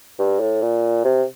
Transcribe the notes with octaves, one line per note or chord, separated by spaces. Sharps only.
G2
A2
A#2
C3